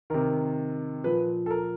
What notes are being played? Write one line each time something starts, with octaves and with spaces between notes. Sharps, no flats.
C3 D#3 A#4
A#2 F3 B4
A4
A#4